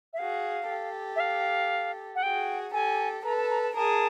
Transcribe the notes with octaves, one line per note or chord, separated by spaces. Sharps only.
E5
F#4 G#4 F5
G4 A4
E5
F5
F#5
F#4 G#4 G5
G4 A4 G#5
A4 B4 A#5
A5
A#5
A5
G#4 A#4 A5